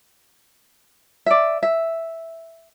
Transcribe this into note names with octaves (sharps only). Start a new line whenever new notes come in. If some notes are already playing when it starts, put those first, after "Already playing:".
D5 E5
E5